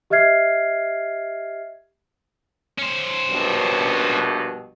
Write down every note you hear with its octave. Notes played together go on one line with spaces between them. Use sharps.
G4 D#5 E5 F6 G#6 C7
C#4 C5
A#1 G2 B2